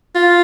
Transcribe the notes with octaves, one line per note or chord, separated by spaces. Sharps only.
F4